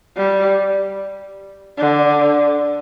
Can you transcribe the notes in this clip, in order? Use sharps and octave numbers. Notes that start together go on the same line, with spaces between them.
G3
D3